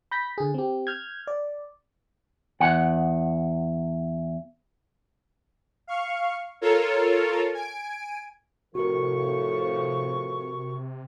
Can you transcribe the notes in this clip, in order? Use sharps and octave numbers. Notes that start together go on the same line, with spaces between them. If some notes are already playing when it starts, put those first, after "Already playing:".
B5 G6 A#6 B6
D3 G#4
C4 G4
F6 G6 G#6
D5
E2 F#5
F5 C#6
F4 A4 A#4 C#5
G#5 D7
A2 C3 F3 F#4 A4 A#4 C#6